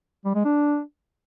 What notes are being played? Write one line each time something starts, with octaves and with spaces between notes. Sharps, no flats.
G3
G#3
D4